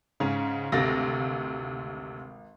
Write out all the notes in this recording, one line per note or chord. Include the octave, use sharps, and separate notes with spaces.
G#2 C#3 C#4
G#1 D2 C3 F5 A6 A#6